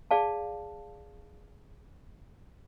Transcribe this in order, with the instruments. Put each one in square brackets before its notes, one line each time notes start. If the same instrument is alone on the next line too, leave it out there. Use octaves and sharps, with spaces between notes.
[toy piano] G#4 D5 F5 A5